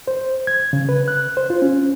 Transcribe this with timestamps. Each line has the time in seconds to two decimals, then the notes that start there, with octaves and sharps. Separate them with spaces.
0.07 C5
0.47 G#6
0.73 C#3
0.89 B4
1.08 F#6
1.37 C5
1.50 F4
1.62 C#4